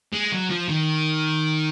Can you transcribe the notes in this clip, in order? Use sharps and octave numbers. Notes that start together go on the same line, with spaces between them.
G#3
F#3
F3
D#3